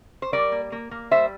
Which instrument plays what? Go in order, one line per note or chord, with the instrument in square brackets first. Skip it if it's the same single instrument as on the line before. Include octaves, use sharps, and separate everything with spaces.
[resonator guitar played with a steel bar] C5
G3 A#4 D5
A#3
A#3
A#3
G3 C5 E5